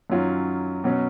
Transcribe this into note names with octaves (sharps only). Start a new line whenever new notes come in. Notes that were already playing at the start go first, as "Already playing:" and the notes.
F#2 D#3 F#3 C#4 F4
B2 F#3 C#4